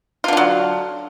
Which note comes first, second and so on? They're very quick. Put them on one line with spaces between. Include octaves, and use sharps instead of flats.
F4 D3 D4 F#3